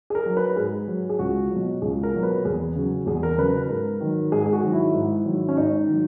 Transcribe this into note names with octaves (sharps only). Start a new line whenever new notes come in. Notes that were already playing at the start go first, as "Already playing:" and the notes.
G#4
A#4
F#3
B4
G#2 G#4
F#3
G#4
C#2 F#4
B2 F#3
C#2 G#4
A#4
B2 F#3
B4
E2 G#4
C#3 F#3
E2 G#4
A#4
C#3 F#3 B4
B4
G#2 A#4
D#3 F#3
G#2 G#4
G#4
F#4
D#3 F#3
E4
G#2
D#3 F#3
C#4
G#2 D#4
D#3 F#3